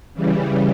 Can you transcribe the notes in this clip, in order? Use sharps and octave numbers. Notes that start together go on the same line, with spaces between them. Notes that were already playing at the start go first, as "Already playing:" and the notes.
C#3 E3 G3